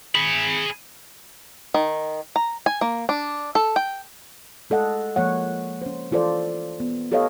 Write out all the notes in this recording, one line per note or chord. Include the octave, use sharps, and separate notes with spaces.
G#4 B5
D#3
A#5
G#5
A#3
D4
A4
G5
G#3 A4 D#5 F#5
F3 G#3 A#3 C#5 F#5
C#4 C5
E3 F4 A4 C5 D5
B3
G4 A4 B4 C#5 D#5 F5